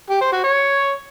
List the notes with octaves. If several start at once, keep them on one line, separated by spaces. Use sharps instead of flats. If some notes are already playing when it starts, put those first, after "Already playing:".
G4
C5
F#4
C#5